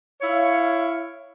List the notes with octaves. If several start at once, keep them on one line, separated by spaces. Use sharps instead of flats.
E4 C#5 F5